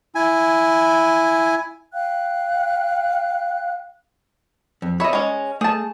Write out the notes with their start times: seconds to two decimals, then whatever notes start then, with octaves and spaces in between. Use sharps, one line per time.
0.15 E4 G#5
1.93 F5 G5 F#6
4.82 F2
5.00 C#5 D#5 E5 B5
5.13 G#3 C#4
5.61 A3 G#4 A5